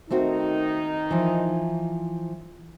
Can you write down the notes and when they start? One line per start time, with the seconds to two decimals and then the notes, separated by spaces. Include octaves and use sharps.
0.11 D#3 A3 C4 D#4 F#4
1.11 E3 F3